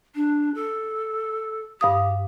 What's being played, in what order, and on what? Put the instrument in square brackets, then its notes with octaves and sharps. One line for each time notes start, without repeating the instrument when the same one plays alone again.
[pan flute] D4
A4
[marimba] G2 F5 D#6 [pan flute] G4